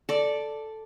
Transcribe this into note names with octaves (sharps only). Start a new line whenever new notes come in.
A4 D5